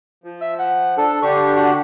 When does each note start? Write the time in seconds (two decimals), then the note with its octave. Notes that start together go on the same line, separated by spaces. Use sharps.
0.24 F3
0.41 E5 E6
0.59 F#5
0.97 D4 A4
1.23 D3 D4 G4 C#6
1.56 F#4 F#5